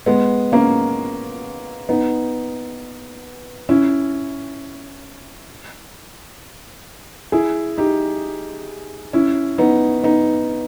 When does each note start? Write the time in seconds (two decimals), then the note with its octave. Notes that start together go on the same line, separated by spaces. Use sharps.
0.06 G#3 B3
0.52 A#3 C#4
1.89 B3 D#4
3.69 C#4 E4
7.32 E4 G#4
7.78 D#4 G4
9.13 C#4 E4
9.58 B3 D#4
10.03 B3 D#4